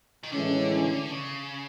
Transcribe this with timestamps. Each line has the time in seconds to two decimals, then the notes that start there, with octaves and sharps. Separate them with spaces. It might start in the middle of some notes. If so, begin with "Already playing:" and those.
0.23 D#3
0.32 A2 D3 E3 G#3 C#4
1.11 C#3